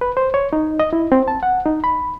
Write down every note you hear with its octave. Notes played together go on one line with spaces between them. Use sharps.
B4
C5
C#5
D#4
D#5
E4
C4
A5
F#5
D#4
B5